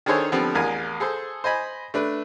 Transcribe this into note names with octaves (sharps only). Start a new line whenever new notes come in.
D#3 D4 G#4 A4 C5 C#5
D3 F3 G3 B3 C4
A1 E2 A#4 G#5
G#4 A4 C5
C5 D#5 G#5 B5
A3 D4 B4